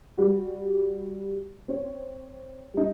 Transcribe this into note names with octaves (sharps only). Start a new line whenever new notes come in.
G3 F#4
C4 C#5
G3 D#4